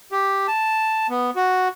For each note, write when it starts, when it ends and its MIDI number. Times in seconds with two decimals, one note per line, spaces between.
0.12 0.47 67
0.48 1.07 81
1.10 1.31 59
1.36 1.68 66